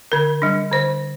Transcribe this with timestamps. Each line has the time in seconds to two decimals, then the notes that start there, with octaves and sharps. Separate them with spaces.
0.12 D3 A#4
0.42 G3 D4
0.72 D3 C5